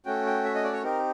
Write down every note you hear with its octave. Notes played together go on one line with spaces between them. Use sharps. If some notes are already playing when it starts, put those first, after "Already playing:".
A3 C#4 F#4 G5
G5
E5
D#5
D5
C#5
C4 D#4 G4 A#4